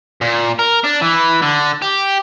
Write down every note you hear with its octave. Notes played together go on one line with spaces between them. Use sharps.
A#2
A#4
D4
E3
D3
G4